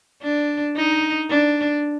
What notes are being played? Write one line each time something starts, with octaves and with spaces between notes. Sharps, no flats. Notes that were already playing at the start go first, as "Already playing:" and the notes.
D4
D#4
D4